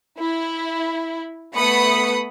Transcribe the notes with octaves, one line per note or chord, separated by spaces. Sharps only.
E4
A3 B3 B4 B5 D#6 C#7